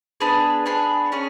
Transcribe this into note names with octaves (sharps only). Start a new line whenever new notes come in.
B3 D4 G#4 B4
B3 D4 G#4 B4
C#4 G#4 C#5